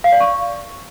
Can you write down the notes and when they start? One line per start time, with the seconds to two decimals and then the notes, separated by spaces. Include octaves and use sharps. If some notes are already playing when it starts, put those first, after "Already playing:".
0.04 F5
0.12 D5
0.20 C#6